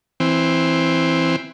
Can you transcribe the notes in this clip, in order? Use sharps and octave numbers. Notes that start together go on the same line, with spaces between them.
E3 C4